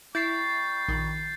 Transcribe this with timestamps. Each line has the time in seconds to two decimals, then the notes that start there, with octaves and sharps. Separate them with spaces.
0.15 G3 E4 C#6 G6 A6 C7
0.88 A#1 D#3